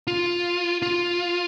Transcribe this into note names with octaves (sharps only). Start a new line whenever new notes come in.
F4
F4